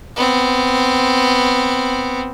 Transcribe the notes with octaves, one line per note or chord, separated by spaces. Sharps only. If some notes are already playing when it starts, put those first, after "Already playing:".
B3 C4